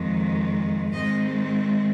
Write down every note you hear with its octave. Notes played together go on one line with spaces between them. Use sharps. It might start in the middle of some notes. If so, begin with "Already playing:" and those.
Already playing: F2 D#3 G#3
G#2 D#3 G#3 C4 D#5